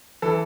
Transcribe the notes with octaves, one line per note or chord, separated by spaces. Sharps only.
E3 A4